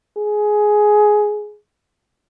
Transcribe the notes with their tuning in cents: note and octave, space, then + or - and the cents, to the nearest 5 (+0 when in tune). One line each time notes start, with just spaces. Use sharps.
G#4 +10